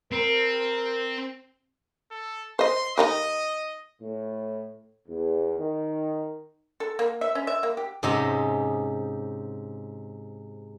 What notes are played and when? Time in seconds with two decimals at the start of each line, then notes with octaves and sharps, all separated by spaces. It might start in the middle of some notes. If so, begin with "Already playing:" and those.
0.12 C4 A#4
2.11 A4
2.59 C5 D#5 C6
2.98 D#3 D#4 G4 D#5
4.02 A2
5.08 E2
5.59 D#3
6.80 A4
6.99 A#3
7.21 E5
7.35 C#4
7.47 E5
7.63 A#3
7.77 G4
8.03 G#2 C3 C#4 G4 D#5 E5